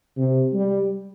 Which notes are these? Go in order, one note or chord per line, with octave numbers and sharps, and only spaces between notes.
C3
G3